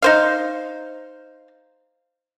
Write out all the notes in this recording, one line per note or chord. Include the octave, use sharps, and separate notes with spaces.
D#4 C5 F5